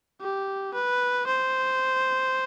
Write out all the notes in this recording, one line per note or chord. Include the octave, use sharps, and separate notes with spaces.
G4
B4
C5